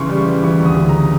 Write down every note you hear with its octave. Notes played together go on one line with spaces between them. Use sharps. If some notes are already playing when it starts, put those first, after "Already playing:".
Already playing: C#3 E3 C6 C#6
G3
E3
E3 C#6
D2
D#6
C#3
A#5